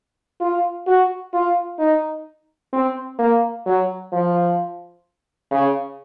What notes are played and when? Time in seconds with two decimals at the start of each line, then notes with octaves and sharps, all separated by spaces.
0.40 F4
0.87 F#4
1.33 F4
1.79 D#4
2.73 C4
3.19 A#3
3.66 F#3
4.12 F3
5.51 C#3